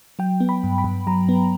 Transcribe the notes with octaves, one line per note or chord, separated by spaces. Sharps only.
F#3 G5
B3
B5
G2
B5
G2
F#3 A#5
B3